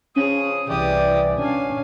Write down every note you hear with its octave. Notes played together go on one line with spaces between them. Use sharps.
C#3 F3 C#4 G#4 D#6
C2 E3 G4 D5 D#6
C#4 D4 F5 G#5